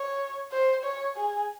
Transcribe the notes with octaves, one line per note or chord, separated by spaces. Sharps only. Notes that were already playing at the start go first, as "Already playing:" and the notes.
Already playing: C#5
C5
C#5
G#4